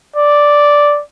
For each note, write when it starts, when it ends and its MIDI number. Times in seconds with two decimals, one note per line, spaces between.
0.16 1.01 74